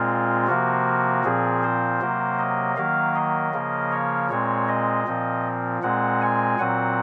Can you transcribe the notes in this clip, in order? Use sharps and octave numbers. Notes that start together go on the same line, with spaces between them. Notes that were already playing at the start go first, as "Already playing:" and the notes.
Already playing: A#2 G#3 C4 F4
C3 F3 A#3 F#4
A#2 F3 C4 G#4
C5
C3 F#3 A#3
D#5
D#3 F#3 A#3 F5
D#5
C#3 F3 A#3
C#5
A#2 G#3 C4 C#5
D#5
A#2 F3 C4
A#2 G#3 C4 F#5
G#5
A#2 F#3 C4 F#5